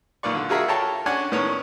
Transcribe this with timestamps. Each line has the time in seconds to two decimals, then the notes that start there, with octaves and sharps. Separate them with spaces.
0.23 B1 A#2 D#3 F4 D5 C#6
0.35 D3
0.49 F4 F#4 G#4 A#4 E5
0.68 A4 C#5 G5 A5 A#5
1.06 C#4 D4 D5 F#5 G#5
1.32 A2 D#3 B3 C#4 C#5